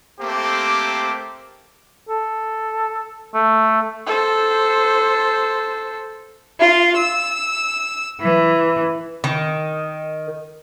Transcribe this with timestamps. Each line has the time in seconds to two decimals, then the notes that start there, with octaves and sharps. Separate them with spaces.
0.21 A3 A#3 C4 G4 C5 D6
2.09 A4
3.34 A3
4.07 A4 C5
6.60 F4
6.96 E6
8.19 E3
9.24 D#3